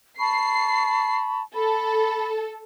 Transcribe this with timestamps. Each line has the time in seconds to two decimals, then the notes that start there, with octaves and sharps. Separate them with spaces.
0.19 A5 B5 C#6 C7
1.54 A4 B5